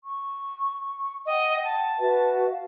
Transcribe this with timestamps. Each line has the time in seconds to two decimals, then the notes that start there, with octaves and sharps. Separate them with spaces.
0.03 C#6
1.26 D#5 F#5 G5
1.64 A5
1.97 F#4 B4 E5
2.47 F5